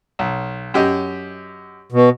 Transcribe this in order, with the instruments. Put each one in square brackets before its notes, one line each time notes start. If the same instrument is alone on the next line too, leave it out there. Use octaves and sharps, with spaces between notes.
[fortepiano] B1
F#2 G4 D#5
[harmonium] B2